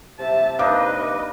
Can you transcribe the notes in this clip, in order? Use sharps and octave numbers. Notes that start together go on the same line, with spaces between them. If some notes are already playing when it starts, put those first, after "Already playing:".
C3 E5 A5
A#3 D4 D#4 B4 D#5 F5 D6